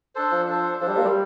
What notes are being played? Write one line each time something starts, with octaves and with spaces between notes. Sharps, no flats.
D4 A4 C5
F3
D4 A4 C5
F3 D4 A4 C5
G3
A#3
G3